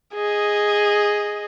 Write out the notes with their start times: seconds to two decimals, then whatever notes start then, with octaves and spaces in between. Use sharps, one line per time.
0.14 G#4 D#5